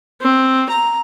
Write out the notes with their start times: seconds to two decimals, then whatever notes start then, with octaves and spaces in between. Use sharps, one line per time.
0.22 C4
0.70 A#5